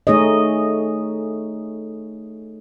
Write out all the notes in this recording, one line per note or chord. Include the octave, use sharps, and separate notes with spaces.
A3 D#4 G#4 C#5 D#5